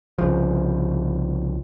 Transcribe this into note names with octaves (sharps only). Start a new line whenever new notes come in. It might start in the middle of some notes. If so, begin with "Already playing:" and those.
C2 C#3 F3